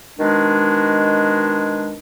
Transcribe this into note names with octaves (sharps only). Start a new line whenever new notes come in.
B2 D#3 G#3 D4